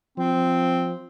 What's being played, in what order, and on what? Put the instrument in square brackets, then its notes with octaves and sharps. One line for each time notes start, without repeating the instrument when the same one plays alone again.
[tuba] F3 [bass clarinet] C4